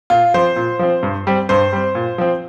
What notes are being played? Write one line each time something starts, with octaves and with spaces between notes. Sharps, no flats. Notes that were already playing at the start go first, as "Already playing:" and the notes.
A#2 F4
F3 C4 C5
A#2
F3 C4
G2
G3 C4
G2 C5
G3 C4
A#2
F3 C4